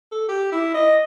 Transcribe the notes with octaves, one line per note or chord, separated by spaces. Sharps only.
A4
G4
E4
D#5